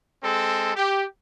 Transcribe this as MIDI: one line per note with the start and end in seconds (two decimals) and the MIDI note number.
0.23 0.75 56
0.23 0.75 60
0.23 0.75 69
0.75 1.05 67